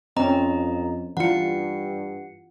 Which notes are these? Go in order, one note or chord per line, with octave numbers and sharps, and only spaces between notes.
F2 C4 C#4 D#5 A#5
G2 E3 F4 F#5 C#7